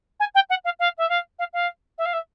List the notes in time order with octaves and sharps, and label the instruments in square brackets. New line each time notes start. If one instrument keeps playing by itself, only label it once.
[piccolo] G#5
G5
F#5
F5
F5
E5
F5
F5
F5
E5
F5
E5